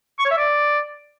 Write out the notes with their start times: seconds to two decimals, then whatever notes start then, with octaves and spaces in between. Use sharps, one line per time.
0.19 C#6
0.25 C#5
0.31 E5
0.37 D5